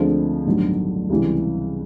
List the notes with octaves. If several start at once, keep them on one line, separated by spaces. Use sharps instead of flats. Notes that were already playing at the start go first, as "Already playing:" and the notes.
Already playing: D2 D3 F3 G#3 C4
A1 G2 D#3 F#3 B3
C#2 C3 E3 G3